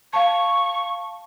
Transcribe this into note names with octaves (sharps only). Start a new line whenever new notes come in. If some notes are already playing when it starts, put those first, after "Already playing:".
F5 A5 C#6